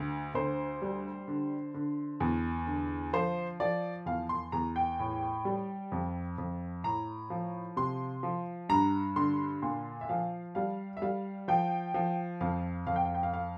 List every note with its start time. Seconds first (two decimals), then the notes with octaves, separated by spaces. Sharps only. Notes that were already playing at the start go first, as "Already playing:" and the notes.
Already playing: D2
0.34 D2 C5
0.82 G3
1.28 D3
1.74 D3
2.20 E2
2.67 D3
3.13 F3 C5
3.60 F3 D5
4.06 E2 F5
4.29 C6
4.52 E2 A#5
4.76 G5
4.99 A2
5.45 G3
5.92 F2
6.38 F2
6.84 A2 A#5
7.30 F3
7.76 C3 C6
8.23 F3
8.69 G2 A#5
9.16 D3 C6
9.62 A#2 C6
10.01 E5
10.09 F3 F5
10.55 G3 F5
10.97 E5
11.02 G3 F5
11.48 F3 G5
11.94 F3
12.41 F2 F5
12.87 F2 F5
12.96 G5
13.05 F5
13.15 G5
13.23 F5
13.34 F5